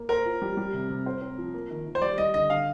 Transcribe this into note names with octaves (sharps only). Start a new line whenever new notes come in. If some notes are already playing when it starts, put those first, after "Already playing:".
Already playing: A#3
A#4 C5
F4
G3
G3
C3
C3
C5
C4
F3
A#3
D#3
D#3
C5
G3 D5
G3 D#5
D3 D#5
D3 F5